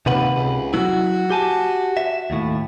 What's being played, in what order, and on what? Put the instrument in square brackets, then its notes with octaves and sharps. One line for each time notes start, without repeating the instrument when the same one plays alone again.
[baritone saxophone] D#2 [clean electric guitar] C3 B4 F#5
[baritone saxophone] C#2
[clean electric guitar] F#3 E4 [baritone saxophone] F#4
[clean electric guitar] G4 G#5 A5
E5
D#2 A2